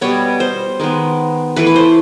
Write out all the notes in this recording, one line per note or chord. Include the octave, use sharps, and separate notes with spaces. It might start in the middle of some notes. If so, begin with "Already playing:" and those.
B2 G3 B3 C#5
C5
D#3 G#3 B3
E3 A3 B4
B4
C5